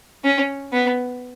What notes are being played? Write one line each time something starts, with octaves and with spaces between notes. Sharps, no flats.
C#4
B3